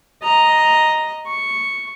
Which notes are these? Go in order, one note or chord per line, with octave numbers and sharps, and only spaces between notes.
D#5 A#5
C#6